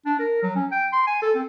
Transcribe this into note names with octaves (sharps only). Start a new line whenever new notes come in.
D4
A#4
F#3
C#4
G5
C6
G#5
A4
C4